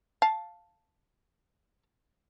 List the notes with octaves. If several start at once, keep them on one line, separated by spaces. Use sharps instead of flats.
F5 A5